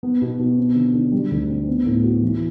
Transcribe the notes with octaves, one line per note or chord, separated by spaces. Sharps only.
B3
B2
B2
C4
D3
D3
G3
D2
C4
B3
A2
F#4
E3